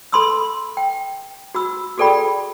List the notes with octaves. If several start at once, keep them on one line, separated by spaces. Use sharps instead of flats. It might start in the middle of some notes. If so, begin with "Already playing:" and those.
A4 B5 C6 D#6 E6
G5
F#4 B5 E6
F#4 G#4 A4 D5 G5 B5